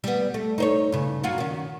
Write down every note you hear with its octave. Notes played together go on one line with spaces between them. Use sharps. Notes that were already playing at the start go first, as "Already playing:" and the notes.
G3 B3
A3
D#4 C5 C#5
G2 C#3
F#3 F4 F#4
D#3 C#4